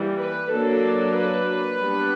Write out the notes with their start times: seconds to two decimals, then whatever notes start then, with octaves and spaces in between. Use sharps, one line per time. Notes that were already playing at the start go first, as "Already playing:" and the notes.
Already playing: E3 G3 A#3
0.18 B4
0.50 F#3 A#3 D4 A4
1.15 B4
1.80 G3 B3 D4